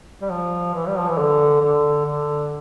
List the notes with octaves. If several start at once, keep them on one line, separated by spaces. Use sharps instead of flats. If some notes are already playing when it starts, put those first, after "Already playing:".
G3
F3
E3
G3
F3
E3
D3
D3
D3